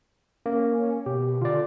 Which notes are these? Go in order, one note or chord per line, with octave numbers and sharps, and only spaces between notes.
A#3 C#4
B2 G4
D3 F4 D5